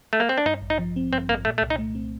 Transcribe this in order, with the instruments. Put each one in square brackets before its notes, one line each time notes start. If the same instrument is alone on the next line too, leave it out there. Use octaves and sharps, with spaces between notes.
[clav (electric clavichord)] A3
A#3
C4
D4
[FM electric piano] G2 [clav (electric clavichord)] D#4
[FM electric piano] A1
[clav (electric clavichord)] D#4
[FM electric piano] F3
C4
[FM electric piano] G2 [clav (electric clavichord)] C4
[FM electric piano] A1 [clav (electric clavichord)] A#3
[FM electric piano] A#2 [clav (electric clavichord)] A3
[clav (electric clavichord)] A3
[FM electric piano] C2
[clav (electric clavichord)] D#4
[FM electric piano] A3
C4